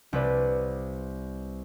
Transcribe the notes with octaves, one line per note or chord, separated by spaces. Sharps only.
C2 B4 D5